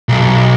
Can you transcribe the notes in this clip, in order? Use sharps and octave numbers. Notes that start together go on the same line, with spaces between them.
B1